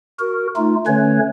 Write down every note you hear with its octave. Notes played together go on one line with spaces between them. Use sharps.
F#4 A#4
A3 D#4 F4
D3 A3 C#4 B4 C#5